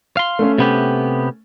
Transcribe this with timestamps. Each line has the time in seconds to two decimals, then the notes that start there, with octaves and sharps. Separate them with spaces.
0.17 F5 C6
0.39 A3 C#4
0.58 C3 B3 G4